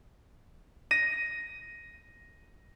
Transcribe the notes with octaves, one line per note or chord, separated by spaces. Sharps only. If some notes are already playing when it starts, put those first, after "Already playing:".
A#6 D#7